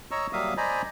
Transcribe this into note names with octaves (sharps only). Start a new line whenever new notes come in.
C#5 D#5 A#5 C#6 E6
F#3 G3 A#3 E5 F5 D#6
C5 D5 D#5 G#5 A#5 B5